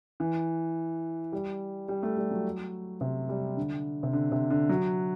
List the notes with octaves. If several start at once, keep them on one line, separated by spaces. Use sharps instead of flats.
E3
G3
G3
A3
G3
F#3
C3
G3
D3
C3
D3
C3
D3
F#3